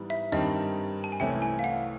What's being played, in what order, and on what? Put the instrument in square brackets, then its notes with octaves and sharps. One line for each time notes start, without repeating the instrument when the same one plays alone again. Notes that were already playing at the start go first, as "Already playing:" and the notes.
Already playing: [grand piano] G#2 E3 G3 B3
[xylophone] E5
[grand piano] G2 D#3 G3 C4 D#4 [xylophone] D#5
[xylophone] A5
G#5
[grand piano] C2 C3 E3 A3 C#4 [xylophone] G5
[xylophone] G#5
F5
F#5